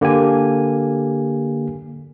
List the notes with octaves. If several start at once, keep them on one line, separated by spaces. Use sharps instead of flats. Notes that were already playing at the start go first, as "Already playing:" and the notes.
D3 A#3 G4 G#5